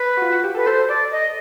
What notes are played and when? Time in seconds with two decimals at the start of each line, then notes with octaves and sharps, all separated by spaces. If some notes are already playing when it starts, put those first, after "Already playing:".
Already playing: B4
0.17 F#4
0.22 F4
0.32 F#4
0.44 G4
0.55 A4 B4
0.66 A4 C5
0.88 A4 D5
1.11 D#5